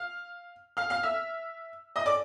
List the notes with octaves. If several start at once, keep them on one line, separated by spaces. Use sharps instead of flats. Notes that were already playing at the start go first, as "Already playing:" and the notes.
Already playing: F5 F6
F5 F6
F5 F6
E5 E6
D#5 D#6
D5 D6